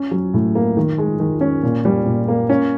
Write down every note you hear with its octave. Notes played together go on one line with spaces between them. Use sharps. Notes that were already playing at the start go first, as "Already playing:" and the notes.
Already playing: C#4
F#3
A2
A#3
D#3
G#3
D#3
C#4
A#2
G3
A#2
A#3
C#4